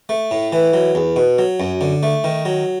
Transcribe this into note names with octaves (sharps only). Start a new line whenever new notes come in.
A3
A2
E3
F#3
E2
B2
F#3
F#2
D3
A3
D#3
F#3